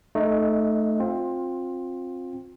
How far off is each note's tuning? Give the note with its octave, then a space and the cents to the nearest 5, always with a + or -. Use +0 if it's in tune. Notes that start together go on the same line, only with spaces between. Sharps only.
A3 -5 D#4 -25 D#5 +0
C4 +15 F4 +25